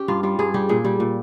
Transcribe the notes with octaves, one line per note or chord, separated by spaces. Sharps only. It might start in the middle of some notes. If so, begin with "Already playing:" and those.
Already playing: C#4 G4
G2 F4
G3 F4
G2 G#4
G3 G4
A#2 G#4
G3 G4
A#2